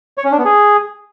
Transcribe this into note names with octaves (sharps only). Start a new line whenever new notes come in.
C#5
C#4
D4
B3
G#4